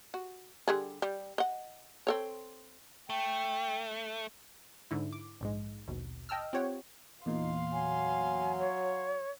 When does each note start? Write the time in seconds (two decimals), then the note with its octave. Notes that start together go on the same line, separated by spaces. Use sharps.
0.14 F#4
0.68 D3 G3 G#4
1.02 G3
1.38 D#5 F#5
2.07 C4 A4 C#5
3.10 A3 G5
4.91 G#2 D3 E4
5.13 D6
5.41 A#1 G#2 G#3
5.88 A#1 D#2 B2
6.29 D#5 G5 A5 E6 F6
6.53 C4 F4 G4 C#5 F#5 G5
7.26 E2 A#2 D#4 F5 C6
7.73 F#3 G#5
8.59 C#5